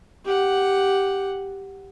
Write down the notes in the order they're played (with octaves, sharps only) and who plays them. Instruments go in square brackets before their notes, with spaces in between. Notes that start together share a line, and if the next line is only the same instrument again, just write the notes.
[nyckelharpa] G4 F#5